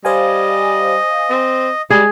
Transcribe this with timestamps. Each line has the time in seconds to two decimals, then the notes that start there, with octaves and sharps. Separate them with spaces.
0.05 G3 C5 D#5 F5 G#5
1.30 C4
1.90 G3 G#3 G#4